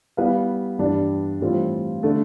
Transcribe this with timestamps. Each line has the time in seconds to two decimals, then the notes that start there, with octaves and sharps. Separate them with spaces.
0.17 G3 B3 E4 B4 F5
0.79 G2 E3 G3 D4
1.41 A2 E3 G3 C4 F4
2.03 D3 A3